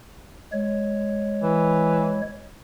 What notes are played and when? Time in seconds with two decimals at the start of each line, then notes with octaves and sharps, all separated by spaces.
0.52 G#3 C#5
1.42 E3